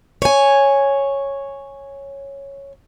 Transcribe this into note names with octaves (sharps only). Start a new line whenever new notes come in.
C#5 G#5